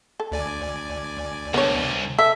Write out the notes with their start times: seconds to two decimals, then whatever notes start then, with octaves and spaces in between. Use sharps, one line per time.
0.20 A4
0.32 D2 D5 G#5
1.54 C2 B3 D4 C#5
2.19 A4 E5